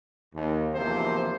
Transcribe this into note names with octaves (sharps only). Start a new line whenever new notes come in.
D#2
G#1 E2 C3 F3 A#3 C5